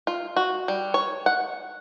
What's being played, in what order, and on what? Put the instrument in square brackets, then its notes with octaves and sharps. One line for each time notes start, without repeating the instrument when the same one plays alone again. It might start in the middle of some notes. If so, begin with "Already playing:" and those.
[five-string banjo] F4
F#4
G3
C#5
F#5